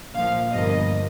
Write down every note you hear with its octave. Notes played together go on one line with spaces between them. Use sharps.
A#1 A#2 F3 F5
G1 G2 F3 A#3 D#5